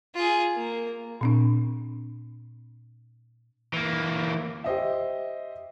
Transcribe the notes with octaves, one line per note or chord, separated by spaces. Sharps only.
F4 G#4
A#3
A#2 C4 D4
E3 A#3
G4 C5 D#5 E5